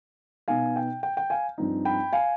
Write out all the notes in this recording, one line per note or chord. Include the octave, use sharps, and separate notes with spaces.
B2 B3 D#4 F5 G#5
G5
G5
G5
F5 G#5
G2 F3 C4 D#4
G5 B5
F5 G#5